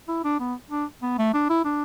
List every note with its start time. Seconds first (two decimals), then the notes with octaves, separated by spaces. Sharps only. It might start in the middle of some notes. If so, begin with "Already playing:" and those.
0.08 E4
0.24 D4
0.40 B3
0.71 D4
1.02 B3
1.18 A3
1.33 D4
1.50 E4
1.64 D4